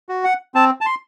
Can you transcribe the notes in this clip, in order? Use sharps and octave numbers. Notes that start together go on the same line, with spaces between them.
F#4
F#5
C4 A5
A5
C6